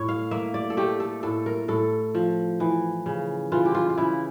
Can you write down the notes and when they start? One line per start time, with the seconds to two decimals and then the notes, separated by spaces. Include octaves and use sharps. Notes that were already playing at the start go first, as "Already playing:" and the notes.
Already playing: A2 C#5
0.08 F5
0.31 A#3 E5
0.54 D5
0.70 A4
0.77 A3 G4
1.00 A4
1.23 A2 A4
1.46 A#4
1.68 A2 A4
2.15 F3
2.60 E3
3.06 C#3
3.52 E3 F4
3.66 G4
3.75 F4
3.89 F4
3.98 C#3 E4